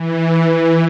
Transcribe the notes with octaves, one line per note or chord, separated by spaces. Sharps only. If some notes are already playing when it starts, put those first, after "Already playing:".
Already playing: E3
E3